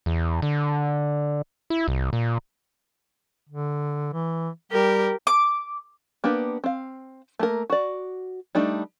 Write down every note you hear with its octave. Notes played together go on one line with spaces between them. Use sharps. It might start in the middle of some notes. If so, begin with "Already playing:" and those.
E2
D3
E4
C2
A#2
D3
E3
G3 G4 A#4
D6
A#3 B3 D4 G4 B4
C4 F5
A3 A#3 A#4
F#4 D5
G3 A3 D4 D#4